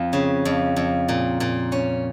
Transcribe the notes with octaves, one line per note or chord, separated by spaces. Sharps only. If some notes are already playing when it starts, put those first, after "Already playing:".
Already playing: F2
C#3
F2
F2
A#2
A#2
C#4